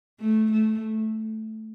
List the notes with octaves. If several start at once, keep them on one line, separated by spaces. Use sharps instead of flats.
A3
A3